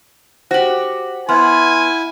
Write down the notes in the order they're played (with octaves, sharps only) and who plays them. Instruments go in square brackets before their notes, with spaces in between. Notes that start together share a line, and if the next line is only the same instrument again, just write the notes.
[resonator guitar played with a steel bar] F#4 G4 [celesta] C5 F#7
[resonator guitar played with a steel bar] B3 [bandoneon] E4 [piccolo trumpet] G#5 [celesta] C6 F6